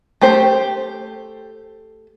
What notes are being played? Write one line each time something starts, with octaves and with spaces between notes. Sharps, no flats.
A3 G4 C5